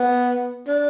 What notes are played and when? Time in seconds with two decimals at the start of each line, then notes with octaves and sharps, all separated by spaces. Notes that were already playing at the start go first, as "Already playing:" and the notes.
Already playing: B3
0.67 D4